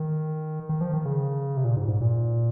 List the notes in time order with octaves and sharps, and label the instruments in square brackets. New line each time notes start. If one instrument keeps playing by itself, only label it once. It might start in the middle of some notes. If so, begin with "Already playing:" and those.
Already playing: [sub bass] D#3
D#3
F3
D#3
C#3
C3
A#2
G#2
G#2
A#2